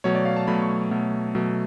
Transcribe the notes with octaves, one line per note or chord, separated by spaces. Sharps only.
B2 F#3 A3 C#5
D5
F5
A5
B2 F#3 A3 B5
C#6
B2 F#3 A3
B2 F#3 A3